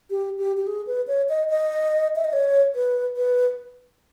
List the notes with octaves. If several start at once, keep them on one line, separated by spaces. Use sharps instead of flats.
G4
G4
G4
G#4
B4
C#5
D#5
D#5
E5
D#5
C#5
B4
B4